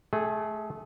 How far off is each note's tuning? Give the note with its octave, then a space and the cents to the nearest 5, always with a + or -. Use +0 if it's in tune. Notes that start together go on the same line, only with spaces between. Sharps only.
A3 -25 G#4 +0